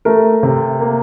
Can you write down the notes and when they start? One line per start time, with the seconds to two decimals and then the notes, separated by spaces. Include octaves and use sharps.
0.05 A3 A#4
0.43 C3
0.80 A#3